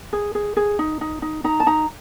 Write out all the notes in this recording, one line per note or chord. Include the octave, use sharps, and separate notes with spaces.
G#4
G#4
G#4
D#4
D#4
D#4
D#4 A#5
A5
D#4 A#5